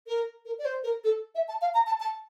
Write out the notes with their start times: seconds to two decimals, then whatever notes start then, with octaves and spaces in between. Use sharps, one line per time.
0.07 A#4
0.45 A#4
0.59 D5
0.65 C5
0.84 A#4
1.04 A4
1.35 E5
1.48 A5
1.61 F5
1.74 A#5
1.87 A5
2.00 A5